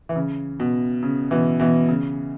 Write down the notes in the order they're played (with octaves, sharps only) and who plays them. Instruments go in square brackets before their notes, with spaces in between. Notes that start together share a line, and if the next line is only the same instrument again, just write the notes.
[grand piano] E3
C#3
B2
C#3
B2 E3
B2 E3
C#3